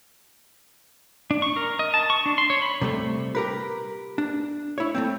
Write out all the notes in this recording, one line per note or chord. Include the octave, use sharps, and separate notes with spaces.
D4
C#6
A#4
D#5
A5
C#6
D4
C6
C#5
B5
C3 G3 A3
G4 A#4 B4
D4
E4 C#5
A3 A#3 C4